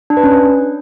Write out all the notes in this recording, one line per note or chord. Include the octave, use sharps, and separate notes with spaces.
D4
B4
C#4